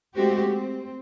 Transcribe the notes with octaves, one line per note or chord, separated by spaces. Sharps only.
G#3 A3 C4 F#4 G4
C4